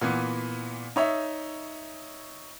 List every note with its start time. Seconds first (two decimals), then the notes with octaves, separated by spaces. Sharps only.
0.01 A#2 E3 B3
0.96 D#4 C#5 E5